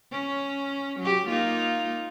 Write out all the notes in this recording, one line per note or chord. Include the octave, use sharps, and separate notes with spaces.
C#4
F#3 G4
A#3 D#4 F4